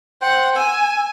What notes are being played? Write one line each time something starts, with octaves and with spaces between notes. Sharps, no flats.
C5 F#5 G5
G#5 E6